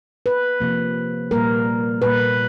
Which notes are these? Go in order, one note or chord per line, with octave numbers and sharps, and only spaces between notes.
B4
C3 F3 A#3
A#2 G3 A#3 A#4
A#2 G3 A#3 B4